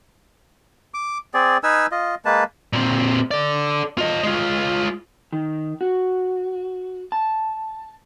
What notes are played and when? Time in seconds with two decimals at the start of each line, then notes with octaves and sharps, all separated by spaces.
0.94 D6
1.34 C4 G#4 D5
1.63 D#4 B4 G#5 E6
1.91 F4 D#5
2.25 G#3 A#3 B4 A5
2.73 A#2 C4
3.31 A4 D5
3.98 F4 D#5
4.23 G#3 F4
5.33 D#3
5.81 F#4
7.12 A5